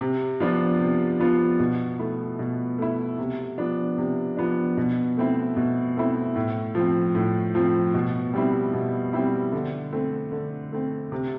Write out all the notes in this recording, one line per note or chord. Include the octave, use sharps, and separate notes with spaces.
C3
F3 B3 D4 F4
C3
F3 B3 D4 F4
B2
A3 E4
B2
A3 E4
C3
F3 B3 D4
C3
F3 B3 D4
B2
A3 C4 E4
B2
A3 C4 E4
A2
F3 C4
A2
F3 C4
B2
G3 C4 E4
B2
G3 C4 E4
D3
A3 C4
D3
A3 C4
C3